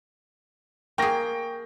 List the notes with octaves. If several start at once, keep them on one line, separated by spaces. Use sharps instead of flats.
A#3 G#4 G5 C#6 A#6